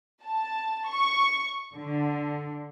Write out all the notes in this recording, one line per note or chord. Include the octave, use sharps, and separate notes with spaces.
A5
C#6
D3